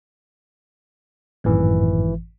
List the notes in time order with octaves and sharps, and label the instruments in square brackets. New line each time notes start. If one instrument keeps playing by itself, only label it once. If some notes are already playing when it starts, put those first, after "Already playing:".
[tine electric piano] G#1 E3 [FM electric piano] F#2 A2